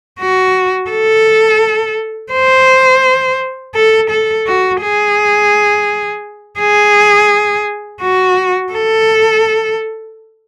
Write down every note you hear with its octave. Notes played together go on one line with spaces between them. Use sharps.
F#4
A4
C5
A4
A4
F#4
G#4
G#4
F#4
A4